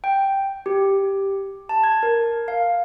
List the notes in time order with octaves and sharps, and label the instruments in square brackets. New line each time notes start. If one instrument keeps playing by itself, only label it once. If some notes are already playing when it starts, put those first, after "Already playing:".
[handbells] G5
G4
A5
G#6
A#4
F5